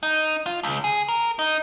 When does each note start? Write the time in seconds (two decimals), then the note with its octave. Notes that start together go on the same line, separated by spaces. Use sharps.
0.03 D#4
0.46 F4
0.63 C#2
0.84 G#4
1.08 A#4
1.39 D#4